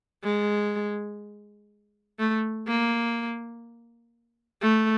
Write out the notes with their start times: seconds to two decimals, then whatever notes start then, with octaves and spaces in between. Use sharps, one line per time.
0.23 G#3
2.19 A3
2.67 A#3
4.62 A3